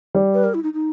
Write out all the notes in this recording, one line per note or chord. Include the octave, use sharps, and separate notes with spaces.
G3
B4
A#4
E4
D#4
D#4